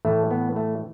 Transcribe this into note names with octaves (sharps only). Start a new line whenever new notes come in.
A2 E3 A3
B3
A3